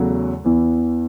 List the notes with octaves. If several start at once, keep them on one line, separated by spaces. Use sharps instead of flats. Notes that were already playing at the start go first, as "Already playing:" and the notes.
Already playing: E2 C#3 F#3 A3 F#4
E2 E3 B3